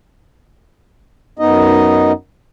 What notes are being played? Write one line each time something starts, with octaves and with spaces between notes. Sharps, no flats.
F#2 B3 D#4 D#5